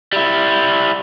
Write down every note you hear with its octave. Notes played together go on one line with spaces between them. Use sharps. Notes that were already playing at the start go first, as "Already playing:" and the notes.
G3 E4